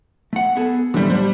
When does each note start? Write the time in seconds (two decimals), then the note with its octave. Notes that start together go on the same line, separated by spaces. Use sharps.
0.33 A3 F#5
0.56 B3 G#4 A4
0.94 D3 E3 G3 A3
1.10 G3 D4 C5